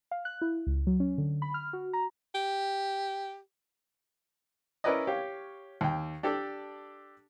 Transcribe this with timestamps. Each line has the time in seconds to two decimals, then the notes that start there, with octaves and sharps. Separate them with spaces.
0.11 F5
0.25 F#6
0.42 E4
0.67 C#2
0.87 F#3
1.00 C#4
1.18 D3
1.42 B5
1.54 F6
1.73 F#4
1.93 A#5
2.35 G4
4.84 C#4 E4 A#4 B4 D5 D#5
5.07 G4 C#5 F5
5.81 D#2 G5
6.23 D4 G4 A4 D5